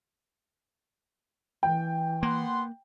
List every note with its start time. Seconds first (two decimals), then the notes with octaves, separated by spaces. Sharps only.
1.63 E3 G5
2.23 A#3 B3 F#5 C6